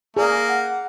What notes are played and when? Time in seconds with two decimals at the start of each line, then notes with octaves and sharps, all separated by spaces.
0.17 A#3 G#4 D5
0.49 F#5